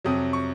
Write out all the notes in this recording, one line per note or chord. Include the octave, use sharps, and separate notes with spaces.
F2 C3 F#3 D#6
C#6